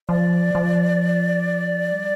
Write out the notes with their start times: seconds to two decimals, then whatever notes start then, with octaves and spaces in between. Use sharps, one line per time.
0.09 F3 D5
0.55 F3
1.92 G3